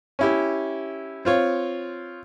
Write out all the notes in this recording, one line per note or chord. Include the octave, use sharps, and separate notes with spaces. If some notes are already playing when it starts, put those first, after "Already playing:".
C#4 E4 G4
C4 F4 C#5